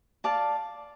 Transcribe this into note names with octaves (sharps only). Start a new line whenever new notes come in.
D5 F5 A5